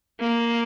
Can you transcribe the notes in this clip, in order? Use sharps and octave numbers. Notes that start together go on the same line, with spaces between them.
A#3